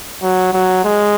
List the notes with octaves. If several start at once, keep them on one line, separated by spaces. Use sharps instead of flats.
F#3
F#3
G#3